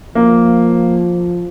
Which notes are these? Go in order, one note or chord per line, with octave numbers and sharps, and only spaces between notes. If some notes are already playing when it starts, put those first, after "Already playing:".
F3 A#3